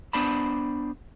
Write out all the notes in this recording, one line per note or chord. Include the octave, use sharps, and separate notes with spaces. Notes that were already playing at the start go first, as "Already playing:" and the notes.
B3 D4 C5 D5 A5 B5